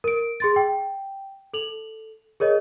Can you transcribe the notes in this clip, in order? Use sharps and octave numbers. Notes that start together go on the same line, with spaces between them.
A#4 D7
G#4 C6 A6
G5
A4 F7 F#7
G#4 A#4 C#5 D#5